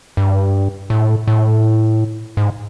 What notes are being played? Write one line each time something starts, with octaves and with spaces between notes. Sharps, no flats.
G2
A2
A2
G#2